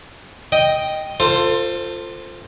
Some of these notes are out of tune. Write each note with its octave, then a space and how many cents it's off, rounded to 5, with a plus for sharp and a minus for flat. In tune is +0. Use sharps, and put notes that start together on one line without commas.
D#5 +0 G5 +0
F4 +0 A4 +30 C5 +0